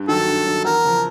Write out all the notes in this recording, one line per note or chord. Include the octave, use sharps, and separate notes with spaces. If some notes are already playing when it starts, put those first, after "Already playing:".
Already playing: G2
D#3 F#3 A4
G2
D#3 F#3
E2 A#4
C#3 F3